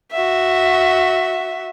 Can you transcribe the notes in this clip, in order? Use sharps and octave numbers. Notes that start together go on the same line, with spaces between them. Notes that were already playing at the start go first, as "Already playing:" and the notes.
F#4 E5